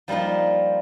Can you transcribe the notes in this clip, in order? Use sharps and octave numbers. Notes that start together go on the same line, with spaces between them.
F3 G3 A#3 D#4 F4